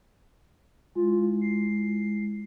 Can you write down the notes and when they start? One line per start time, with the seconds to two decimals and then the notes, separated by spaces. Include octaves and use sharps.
0.95 G#3 E4 F4
1.41 C7